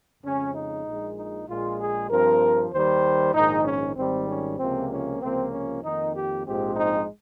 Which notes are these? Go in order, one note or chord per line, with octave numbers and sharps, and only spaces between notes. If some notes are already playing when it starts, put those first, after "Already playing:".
F2 C#3 G#3 C#4
D#4
A#1 A#2 G#3
D#4
A#1 A#2 G#3 F4
G#4
G2 F3 C4 A#4
D#2 D#3 G3 C5
A#1 G#2 D#3 D#4
C#4
G#1 G#2 D#3 G3 C4
C#4
C#2 C3 F3 A#3 C4
C#4
C#2 C3 F3 A#3 C4
C#4
F2 D#3 A#3 D#4
G4
A#1 G#2 F3 G#3 C4 G4
D#4